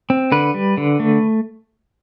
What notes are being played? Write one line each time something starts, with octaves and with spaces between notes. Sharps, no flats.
C4
D3 B4
G3
D3
A3